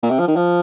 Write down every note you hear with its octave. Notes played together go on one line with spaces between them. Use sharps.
A#2
C3
F3
D#3
F3